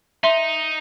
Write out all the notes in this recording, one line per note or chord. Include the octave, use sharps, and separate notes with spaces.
D#4 E5 C6